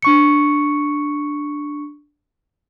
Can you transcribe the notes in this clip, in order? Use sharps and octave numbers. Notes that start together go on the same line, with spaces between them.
D4 C#6 C#7